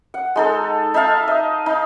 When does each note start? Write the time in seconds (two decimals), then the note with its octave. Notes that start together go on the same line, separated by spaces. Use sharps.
0.14 F#5
0.36 G#3 D#4 A4
0.94 D#4 E5 F5 A5
1.28 D#5
1.66 D#4